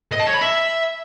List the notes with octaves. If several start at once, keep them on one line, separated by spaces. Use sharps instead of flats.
D#5
A5
C#5
B5
E5